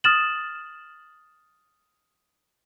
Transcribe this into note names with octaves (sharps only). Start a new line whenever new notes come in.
D#6 F6 A6 E7 F#7